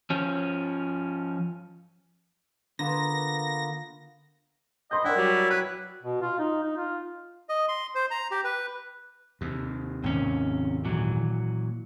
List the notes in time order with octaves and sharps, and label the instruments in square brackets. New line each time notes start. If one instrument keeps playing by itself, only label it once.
[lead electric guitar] F3 C#4
[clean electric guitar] D3 [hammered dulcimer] A#3 B3 F4 [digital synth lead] A#6
[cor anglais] D#5 [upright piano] B5 C6 G6
[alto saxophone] D4 [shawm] E4 [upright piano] A#4 G5 [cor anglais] F#5
[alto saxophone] F#3 [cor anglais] G3
[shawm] B4 [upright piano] G#6
[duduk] B2
F4
D#4
D#4
F4
[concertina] D#5
C6
C5
A#5
G4
B4
[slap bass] D#2 C3
[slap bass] G#1 D#2 [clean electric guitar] C3 C#4
[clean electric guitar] A#2 E3 F#3